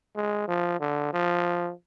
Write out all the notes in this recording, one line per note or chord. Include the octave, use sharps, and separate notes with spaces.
G#3
F3
D3
F3